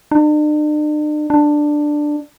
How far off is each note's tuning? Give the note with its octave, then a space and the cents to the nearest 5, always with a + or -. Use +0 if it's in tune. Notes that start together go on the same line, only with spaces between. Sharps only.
D4 +45
D4 +10